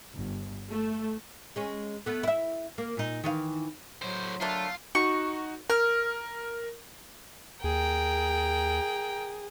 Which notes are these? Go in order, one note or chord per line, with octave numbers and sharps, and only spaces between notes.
G1
A3
G#3 C#4
A3 B3
E4 E5
A#3
A#2 D#4
D#3 E3 F5
A2 F#3 C5
D3 A3 A#3 F4
D#4 F#4 C#6
A#4 F6
D#2 G#4 A#4 G5